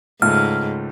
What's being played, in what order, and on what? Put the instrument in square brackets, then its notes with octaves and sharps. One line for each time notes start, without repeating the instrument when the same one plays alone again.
[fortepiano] C#2 A3 [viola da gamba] G#2 [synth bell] F6